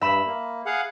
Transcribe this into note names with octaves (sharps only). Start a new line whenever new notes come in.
G2 E5 B5 E7
A#3
G#4 F5 F#5